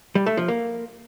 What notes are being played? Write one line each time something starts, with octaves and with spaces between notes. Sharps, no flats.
G3
A3
F3
A#3